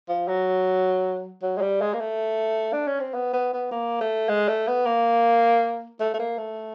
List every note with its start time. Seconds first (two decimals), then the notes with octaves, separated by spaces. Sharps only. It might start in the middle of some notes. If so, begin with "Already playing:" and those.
0.09 F3
0.28 F#3
1.42 F#3
1.58 G#3
1.61 G3
1.81 G#3
1.94 A#3
2.00 A3
2.73 D4
2.87 C#4
3.00 C4
3.14 B3
3.33 B3
3.53 B3
3.71 A#3
4.01 A3
4.29 G#3
4.48 A3
4.67 B3
4.86 A#3
6.00 A3
6.14 A3
6.19 A#3
6.38 A3